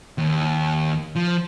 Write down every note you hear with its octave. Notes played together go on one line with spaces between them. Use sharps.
D#2
F3